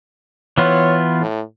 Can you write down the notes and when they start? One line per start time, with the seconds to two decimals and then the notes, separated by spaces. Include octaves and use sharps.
0.58 E3 B3 F4 C#5
1.21 A2